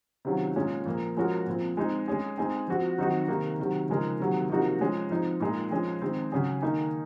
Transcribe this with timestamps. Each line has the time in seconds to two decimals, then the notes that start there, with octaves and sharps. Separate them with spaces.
0.25 C3 D#3 F#3 C#4 F4
0.56 A#2 G#3 C#4 F4
0.85 A#2 F3 A#3
1.16 F3 G#3 C#4 F#4 A#4
1.46 A#2 F3 C4
1.77 G#3 C4 D#4
2.08 G#3 C#4 G#4
2.38 G#3 C4 D#4 G#4
2.68 F3 C4 F#4
2.98 D#3 F#3 C4 D#4 F#4
3.28 C3 D#3 A#3
3.59 C3 D#3 F#3
3.89 C#3 F3 G#3 D#4 A#4
4.20 C3 D#3 F#3 A#3
4.49 C3 F3 A#3 D#4 F#4
4.80 F3 G#3 C#4
5.10 F3 C4 D#4
5.40 A#2 G#3 D#4 A#4
5.71 F3 G#3 C#4 G#4
6.02 D#3 G#3 C4
6.32 C#3 F#3 C#4 G#4
6.62 D#3 A#3 D#4 G#4